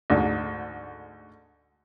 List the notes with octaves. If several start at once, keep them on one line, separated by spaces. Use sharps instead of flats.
D2 G#2 D3